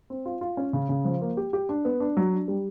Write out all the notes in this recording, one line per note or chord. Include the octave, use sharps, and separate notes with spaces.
C4
F4
F4
C#4
C#3
C#3
F3
A#3
G4
G4
D4
B3
D4
F#3
D4
G3